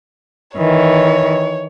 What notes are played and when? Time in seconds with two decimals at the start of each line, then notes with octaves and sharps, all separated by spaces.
0.58 D#3 E3 C#5